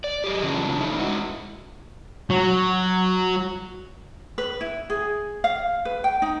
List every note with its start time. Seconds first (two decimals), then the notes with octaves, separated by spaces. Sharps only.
0.04 D5
0.24 G4 G#4 D#5
0.43 C#3 E3 F#3 C#4 D4 F4
0.79 A3 C#4 D#4 E4
0.98 G#3 E4 F#4
2.30 F#3
4.38 B4
4.61 E4
4.90 G#4
5.44 F5
5.85 B4
6.04 G5
6.22 D#4